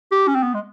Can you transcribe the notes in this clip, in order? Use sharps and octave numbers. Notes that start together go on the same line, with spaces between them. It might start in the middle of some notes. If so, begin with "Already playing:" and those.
G4
C#4
C4
B3
G#3